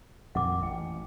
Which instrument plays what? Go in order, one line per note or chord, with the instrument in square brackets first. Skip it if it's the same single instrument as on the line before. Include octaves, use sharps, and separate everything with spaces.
[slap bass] F2 A#2 D#3 [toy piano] F#5 D6
[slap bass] A1 [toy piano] G5